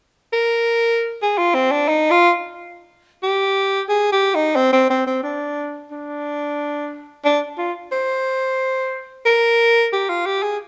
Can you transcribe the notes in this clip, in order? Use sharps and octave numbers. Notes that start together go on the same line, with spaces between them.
A#4
G#4
F4
C4
D4
D#4
F4
G4
G#4
G4
D#4
C4
C4
C4
C4
D4
D4
D4
F4
C5
A#4
G4
F4
G4
G#4